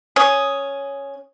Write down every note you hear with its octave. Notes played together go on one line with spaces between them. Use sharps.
C#4 D#6